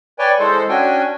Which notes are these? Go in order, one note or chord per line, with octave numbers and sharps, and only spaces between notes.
B4 C#5 D5 G5 G#5
E3 G#3 A4 C5
C#4 D4 F#4 G5 G#5